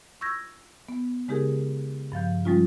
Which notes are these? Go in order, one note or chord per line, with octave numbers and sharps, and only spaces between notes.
C#6 E6 G6 G#6 A#6
B3
C#3 G#3 D#4 G4 G#4 A#4
G2 F3 F5 G6
F3 G3 G#3 C#4 D#4 F4